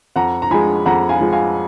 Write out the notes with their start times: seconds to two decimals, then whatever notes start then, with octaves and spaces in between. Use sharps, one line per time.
0.16 F2 F#5 A#5
0.42 A#5
0.51 F3 G#3 G#5 B5
0.86 F2 F#5 A#5
1.09 F5 G#5
1.21 F3 G#3
1.33 F5 G#5